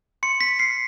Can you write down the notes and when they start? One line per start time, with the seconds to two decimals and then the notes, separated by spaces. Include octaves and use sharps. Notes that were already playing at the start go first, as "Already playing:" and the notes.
0.23 C6 C#7
0.41 B6
0.59 F6 C7